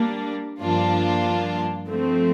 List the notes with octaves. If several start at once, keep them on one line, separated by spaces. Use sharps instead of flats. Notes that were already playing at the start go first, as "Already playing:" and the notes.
Already playing: G3 A#3 D4
G2 F3 A#3 D4 F4
F3 A3 C4